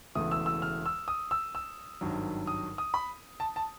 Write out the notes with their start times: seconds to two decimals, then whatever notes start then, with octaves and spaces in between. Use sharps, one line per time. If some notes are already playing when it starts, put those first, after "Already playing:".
0.15 E1 E2 C#3 E3 A3 D#6
0.31 E6
0.46 E6
0.62 F6
0.86 E6
1.08 D#6
1.31 E6
1.55 E6
2.01 G#1 G2 D#3 F#3
2.47 D#6
2.78 D#6
2.94 B5
3.40 A5
3.56 A5